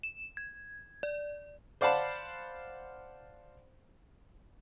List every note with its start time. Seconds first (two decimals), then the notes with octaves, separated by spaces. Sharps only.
0.03 E7
0.37 G#6
1.03 D5
1.81 C5 D5 F5 F#5 A5 B5